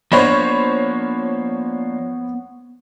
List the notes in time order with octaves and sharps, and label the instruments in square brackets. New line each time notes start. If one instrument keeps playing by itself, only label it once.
[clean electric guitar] F3 A#3 D4 [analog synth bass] B3 [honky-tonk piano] C5 C#5 B5